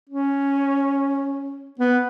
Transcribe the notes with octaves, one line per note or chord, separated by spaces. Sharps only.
C#4
B3